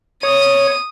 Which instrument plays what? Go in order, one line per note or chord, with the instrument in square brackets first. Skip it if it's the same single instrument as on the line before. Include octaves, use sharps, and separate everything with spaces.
[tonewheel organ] C#5 [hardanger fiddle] D#6